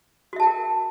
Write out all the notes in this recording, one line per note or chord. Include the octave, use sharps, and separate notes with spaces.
F#4 A#4 E5 G5 A5